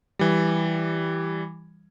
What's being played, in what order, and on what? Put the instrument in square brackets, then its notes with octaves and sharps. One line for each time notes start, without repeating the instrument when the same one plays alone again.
[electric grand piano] E3 G3